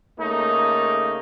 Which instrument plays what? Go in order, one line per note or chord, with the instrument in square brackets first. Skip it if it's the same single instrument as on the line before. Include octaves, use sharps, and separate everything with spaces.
[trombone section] C#3 A3 A#3 D#4